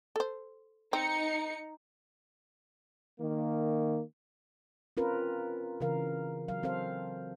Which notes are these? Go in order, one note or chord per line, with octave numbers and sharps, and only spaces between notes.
A4 C5
C4 D#4 C#7
D#3 A#3
C4 C#4 F4 A#4 B4
C#3 E3 A#4 F5
F#3 F5
C4 A4 C5 F5